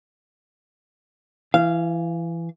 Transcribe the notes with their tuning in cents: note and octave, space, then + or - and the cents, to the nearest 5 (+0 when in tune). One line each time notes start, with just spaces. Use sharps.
E3 +20 F5 -15